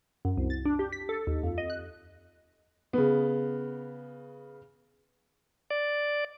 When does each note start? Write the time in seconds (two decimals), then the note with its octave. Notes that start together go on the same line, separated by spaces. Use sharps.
0.25 F#2
0.37 C2
0.50 A6
0.65 D4
0.79 G4
0.92 B6
1.09 A4
1.27 D#2
1.43 F2
1.58 D#5
1.70 F#6
2.93 C#3 B3
5.70 D5